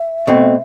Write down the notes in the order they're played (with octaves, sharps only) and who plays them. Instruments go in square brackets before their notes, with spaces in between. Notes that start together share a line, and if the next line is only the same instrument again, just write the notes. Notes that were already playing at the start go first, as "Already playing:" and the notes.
Already playing: [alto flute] E5
[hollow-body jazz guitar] B2 A3 C4